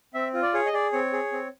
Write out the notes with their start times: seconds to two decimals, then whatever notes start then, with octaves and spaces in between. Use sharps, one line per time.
0.14 C4 E5
0.34 F4
0.42 D5
0.54 G#4 C#5
0.66 D#5
0.73 G#4 D5
0.93 C4 C#5
1.13 G#4
1.32 C4